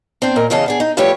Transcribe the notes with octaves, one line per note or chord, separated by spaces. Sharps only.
C4 D4 C5
A#2 A#4 D#5
E2 C#3 E3 D#5 F5 A5
B3 D4 G#4
D#4
F3 G3 A3 G4 B4 C#5